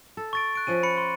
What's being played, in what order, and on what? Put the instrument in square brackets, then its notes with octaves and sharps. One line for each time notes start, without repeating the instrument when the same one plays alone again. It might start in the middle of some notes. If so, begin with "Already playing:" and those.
[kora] A4
[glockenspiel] C#6 A6 D7
F#6 D7
[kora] F3 C#4 G#4 [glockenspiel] D#7
[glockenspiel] B5 C#7
C6